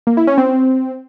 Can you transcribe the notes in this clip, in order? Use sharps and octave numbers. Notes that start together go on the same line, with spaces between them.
A#3
E4
C#4
C4